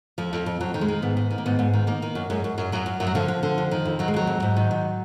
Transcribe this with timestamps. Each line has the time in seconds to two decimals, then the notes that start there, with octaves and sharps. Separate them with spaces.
0.18 F2 F3
0.33 F2
0.46 F2
0.60 F2 F#3
0.74 D#3
0.81 G#3
0.88 D#3
1.02 G#2 B3
1.17 D#3
1.31 D#3
1.38 A#3
1.46 G#2 B3
1.59 G#2
1.74 D#3
1.87 D#3 A#3
2.02 D#3
2.15 F#2
2.30 F#2 G#3
2.44 F#2
2.58 F#2
2.72 F#2 F#3
2.86 F#2
3.00 F#2
3.07 F#3
3.15 D3 F3
3.28 D3
3.43 D3
3.58 F2
3.71 D#3
3.85 F2
3.99 D#3 F#3
4.08 G#3
4.14 F2 F#3
4.27 F2
4.42 G#2
4.56 D#3
4.71 G#2